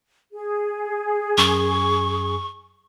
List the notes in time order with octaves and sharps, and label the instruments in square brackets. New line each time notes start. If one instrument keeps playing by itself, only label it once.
[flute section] G#4
[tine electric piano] F#2 [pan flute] C#6